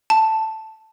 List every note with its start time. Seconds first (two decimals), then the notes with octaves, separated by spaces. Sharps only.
0.10 A5